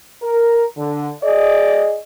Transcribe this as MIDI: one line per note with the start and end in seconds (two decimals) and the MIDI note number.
0.22 0.63 70
0.78 1.09 50
1.23 1.97 68
1.23 1.97 74
1.23 1.97 75